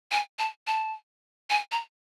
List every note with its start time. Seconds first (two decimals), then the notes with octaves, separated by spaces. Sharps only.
0.12 G#5
0.39 A5
0.67 A5
1.50 G#5
1.72 A#5